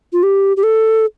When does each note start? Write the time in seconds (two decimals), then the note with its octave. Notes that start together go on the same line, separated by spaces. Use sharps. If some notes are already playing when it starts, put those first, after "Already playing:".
0.13 F4
0.23 G4
0.57 G4
0.63 A4